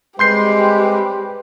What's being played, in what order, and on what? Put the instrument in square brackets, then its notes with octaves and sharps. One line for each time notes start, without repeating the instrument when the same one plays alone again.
[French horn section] G3 C4 B4 [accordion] G#3 [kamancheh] G4 [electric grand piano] C6 G6 C7